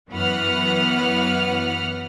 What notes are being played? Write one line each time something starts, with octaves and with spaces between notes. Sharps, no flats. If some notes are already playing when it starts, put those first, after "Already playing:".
F#2 E3 B3 B4 F#5 F6